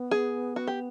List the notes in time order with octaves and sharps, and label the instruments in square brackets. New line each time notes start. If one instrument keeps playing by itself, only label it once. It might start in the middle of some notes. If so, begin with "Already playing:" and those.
Already playing: [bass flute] B3
[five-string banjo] G#4
F#4
G4